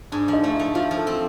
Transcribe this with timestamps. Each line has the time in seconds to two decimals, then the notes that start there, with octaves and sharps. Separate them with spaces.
0.12 G#2 D4
0.28 F3
0.33 D#4
0.44 A3
0.54 E4
0.59 A3
0.75 F3 F4
0.91 F3
0.96 A4
1.07 C4